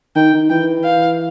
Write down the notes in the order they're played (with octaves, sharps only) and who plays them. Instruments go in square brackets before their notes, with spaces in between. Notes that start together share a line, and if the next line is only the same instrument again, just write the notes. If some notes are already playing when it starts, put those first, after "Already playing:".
[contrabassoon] D#3 [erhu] G5
[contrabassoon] D#3
[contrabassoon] E3 [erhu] G5
[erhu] F5